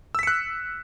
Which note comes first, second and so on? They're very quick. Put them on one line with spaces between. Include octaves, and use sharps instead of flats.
E6 B6 C#7 F#6